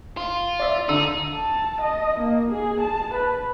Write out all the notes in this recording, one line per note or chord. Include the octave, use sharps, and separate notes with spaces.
F4
D5 E5
D3 D#4 E6
A5
D#5
A#3
G#4
A5
B4